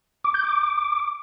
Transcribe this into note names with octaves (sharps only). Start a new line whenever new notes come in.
D6
G6
D6